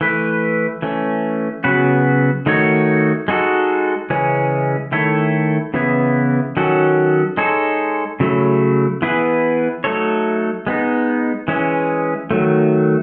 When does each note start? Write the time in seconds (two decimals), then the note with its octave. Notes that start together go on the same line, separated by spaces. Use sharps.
0.01 E3 A3 E4 B4
0.82 E3 A3 C#4
1.64 C#3 F#3 B3 F#4 B4
2.46 D#3 A3 D#4 F#4 C#5
3.28 G#3 D#4 F#4 A4
4.10 C#3 E3 G#3 C#4
4.92 D#3 A3 E4 A4 C#5
5.74 C#3 E3 B3 E4
6.57 D#3 F#3 C#4 F#4 A4
7.37 G#3 D#4 A4 C#5
8.20 C#3 F#3 A3 E4
9.02 E3 B3 E4 G#4 B4
9.84 F#3 A3 D#4 A4 C#5
10.67 G#3 B3 D#4
11.48 E3 G#3 C#4
12.31 D#3 F#3 A3